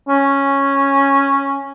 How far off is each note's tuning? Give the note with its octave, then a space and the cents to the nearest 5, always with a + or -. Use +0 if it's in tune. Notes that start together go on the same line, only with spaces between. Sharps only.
C#4 -5